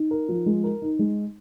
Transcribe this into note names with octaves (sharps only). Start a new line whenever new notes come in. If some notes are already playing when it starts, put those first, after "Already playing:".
Already playing: D#4
A#4
F3
G#3
A#4
D#4
G#3